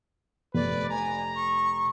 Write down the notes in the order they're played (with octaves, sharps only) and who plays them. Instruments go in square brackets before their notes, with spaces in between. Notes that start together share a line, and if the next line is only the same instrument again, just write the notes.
[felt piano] F1 [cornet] B4 [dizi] D5
[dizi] G#5 [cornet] A#5
[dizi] C#6